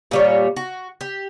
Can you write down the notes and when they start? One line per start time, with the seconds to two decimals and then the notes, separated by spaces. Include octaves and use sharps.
0.11 A#2 G3 C#5
0.56 F#4
1.01 G4